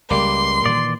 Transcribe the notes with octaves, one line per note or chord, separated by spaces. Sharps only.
C#2 G3 A#3 C6
A#2 D#3 E3 D5